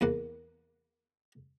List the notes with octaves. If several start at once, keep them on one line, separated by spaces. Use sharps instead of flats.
E2 A#3 F#5